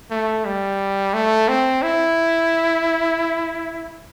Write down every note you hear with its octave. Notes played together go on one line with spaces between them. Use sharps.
A3
G3
A3
C4
E4